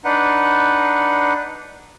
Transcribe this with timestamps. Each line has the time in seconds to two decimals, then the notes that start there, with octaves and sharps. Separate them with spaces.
0.05 D4 D#4 B4 F#5